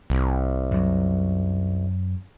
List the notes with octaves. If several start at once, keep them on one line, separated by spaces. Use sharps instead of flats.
C2
F#2 F#3